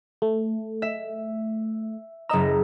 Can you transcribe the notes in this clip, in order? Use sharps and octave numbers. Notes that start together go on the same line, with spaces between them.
A3
E5
F#1 D#5 A#5 E6